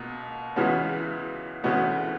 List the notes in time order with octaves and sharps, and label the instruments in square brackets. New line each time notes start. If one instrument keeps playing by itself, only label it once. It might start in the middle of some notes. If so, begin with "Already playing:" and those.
Already playing: [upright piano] C#2 B2 A#3
C#2 C#3 E3 B3 F#4
D2 C#3 E3 B3 F#4